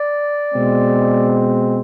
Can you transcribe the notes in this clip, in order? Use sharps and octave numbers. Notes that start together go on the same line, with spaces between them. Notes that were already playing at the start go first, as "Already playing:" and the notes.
Already playing: D5
B2 G#3 C4